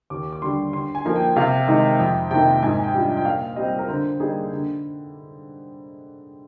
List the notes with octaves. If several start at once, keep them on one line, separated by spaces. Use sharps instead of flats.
D#2 D6
D6
D3 G3 C6
D3 C6
G#5
F3 A#3 D#4
G5
C3 F5
D#3 G#3 D#4
F2 G5
C3 D#3 A#3 D#4 G5
G#2 G#5
G#5
G5
G3 D4 F4
G5
A#2 F5
G3 C4 D#5
A#4
D3 C5
G3 A#3 D#4 G#4
D3